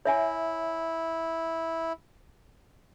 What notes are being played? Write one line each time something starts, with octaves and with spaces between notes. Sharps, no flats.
E4 C#5 E5 G#5